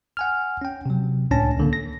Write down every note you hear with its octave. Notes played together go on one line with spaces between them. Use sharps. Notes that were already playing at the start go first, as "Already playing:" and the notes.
F#5 G#5 F6
C#4 G5
C3 F#3
C#2 A2 C#4 D4 A5 A#6
C#2 D3 A#3
A#6